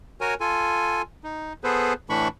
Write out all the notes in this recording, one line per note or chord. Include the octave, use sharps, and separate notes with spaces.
F#4 A#4 C#5 G#5
F4 A4 G#5
D#4
B3 G#4 A4 B4 C5
A2 E3 A3 D4 B5 C#6